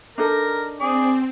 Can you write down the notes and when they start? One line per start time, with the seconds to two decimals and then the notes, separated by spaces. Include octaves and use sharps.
0.18 D4 D#4 A4 A#4
0.80 C4 G#4 D5